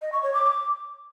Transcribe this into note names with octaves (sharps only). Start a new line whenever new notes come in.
D#5
C#6
C#5
D6
D6